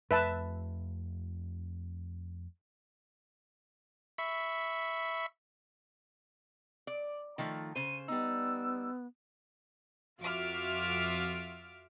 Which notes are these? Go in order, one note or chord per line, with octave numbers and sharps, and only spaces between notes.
F2 A3 B4 E5 A5
E5 B5 C#6
D5
D#3 F3 A3
C#3 C5 D#7
G3 B3 D#4 E6
F2 F4 F#4 E5 D6 F6